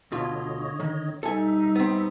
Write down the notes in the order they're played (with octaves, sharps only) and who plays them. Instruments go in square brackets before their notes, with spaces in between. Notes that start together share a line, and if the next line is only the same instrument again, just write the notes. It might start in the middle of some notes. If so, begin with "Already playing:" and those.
[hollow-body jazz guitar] D2 B2 F4 [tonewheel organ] D3 C#5 D#5
[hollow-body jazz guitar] D#3
[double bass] G3 D#4 [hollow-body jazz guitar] A4 G#5 [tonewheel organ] E5
[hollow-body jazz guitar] B3 C4